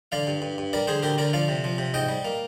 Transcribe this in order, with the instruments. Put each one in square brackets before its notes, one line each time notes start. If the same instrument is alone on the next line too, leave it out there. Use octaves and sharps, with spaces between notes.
[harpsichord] D3 D5 F5
G2
G2
G2
G3 A#4 D5
D3 G#4 C5
D2 G4 A#4
D3 A#4 D5
F3 D5 F5
C3
F3
C3
G#2 D#5 G5
G3
A#3